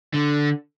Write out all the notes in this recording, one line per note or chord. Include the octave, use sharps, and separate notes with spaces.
D3